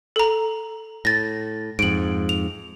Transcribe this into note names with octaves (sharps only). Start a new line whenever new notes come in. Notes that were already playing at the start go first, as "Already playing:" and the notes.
A4 A#5
A2 A6 A#6
F2 G#2 D7 F#7
F7